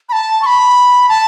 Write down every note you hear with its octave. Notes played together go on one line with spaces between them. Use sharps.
B5
A5
C#6
B5
A5